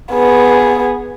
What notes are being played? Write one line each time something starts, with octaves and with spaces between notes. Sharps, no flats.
B3 G#4